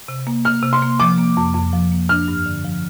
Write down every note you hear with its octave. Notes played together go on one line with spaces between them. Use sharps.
C3
A#3
A#3 F6
C3
C6
A#3
F3 D6
A#3
F2
F2
F3
A#3
D4 F6
G2
D3
F3